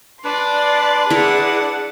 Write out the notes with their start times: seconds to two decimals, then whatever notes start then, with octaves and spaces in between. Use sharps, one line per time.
0.25 D4 B4 D5 C6
1.10 E4 G#4 A#4 D5 F#5